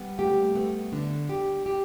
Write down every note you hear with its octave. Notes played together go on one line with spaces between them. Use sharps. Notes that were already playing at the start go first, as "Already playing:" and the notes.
Already playing: G3 B3
A3 G4
G3
A3
A3 B3
D3 D4
G4
G4